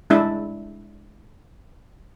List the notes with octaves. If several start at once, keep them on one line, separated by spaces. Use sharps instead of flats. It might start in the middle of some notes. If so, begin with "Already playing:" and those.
G#3 D4 E4 E5